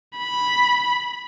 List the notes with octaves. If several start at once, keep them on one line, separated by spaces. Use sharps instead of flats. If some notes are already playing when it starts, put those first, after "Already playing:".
B5